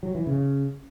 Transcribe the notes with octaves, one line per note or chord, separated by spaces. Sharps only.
F#3
E3
C#3